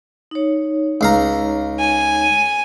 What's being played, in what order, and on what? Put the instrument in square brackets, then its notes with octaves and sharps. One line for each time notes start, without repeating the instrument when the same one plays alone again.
[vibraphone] D#4 C#5
[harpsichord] C#2 F5 A#5
[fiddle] G#5